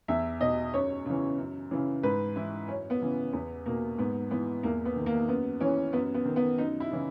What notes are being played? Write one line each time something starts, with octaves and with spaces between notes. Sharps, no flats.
E2 E5
B2 D#5
F#2 C#5
C#3 E3
F#2
C#3 E3
G#2 B4
E3 E4
F#2 C#4
B3
C#3 E3
E2 B3
B2 A#3
G#2 B3
E3 B3
E2 A#3
B3
D#3
A#3
F#2 B3
E3 C#4
F#2 B3
B3
D#3
B3
F#2 D#4
E4
C#3 E3